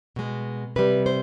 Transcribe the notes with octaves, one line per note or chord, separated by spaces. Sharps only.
B2 G#3
C3 G3 B4
C5